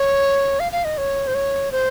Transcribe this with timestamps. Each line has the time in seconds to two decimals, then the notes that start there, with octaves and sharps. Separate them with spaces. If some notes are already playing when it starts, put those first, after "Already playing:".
Already playing: C#5
0.60 F5
0.72 F5
0.85 D#5
0.98 C#5
1.27 C5
1.35 C#5
1.72 C5